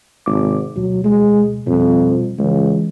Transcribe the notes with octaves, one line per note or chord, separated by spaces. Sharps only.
G#1 C3 D6
D2 B2 F#3
G#3
F2 B2 G3
C#2 E3 G#3